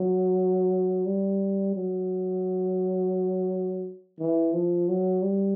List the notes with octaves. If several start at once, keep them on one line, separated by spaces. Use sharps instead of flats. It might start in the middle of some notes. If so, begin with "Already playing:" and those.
Already playing: F#3
G3
F#3
E3
F3
F#3
G3